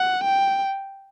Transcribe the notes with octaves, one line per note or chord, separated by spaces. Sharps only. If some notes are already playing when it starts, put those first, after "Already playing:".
Already playing: F#5
G5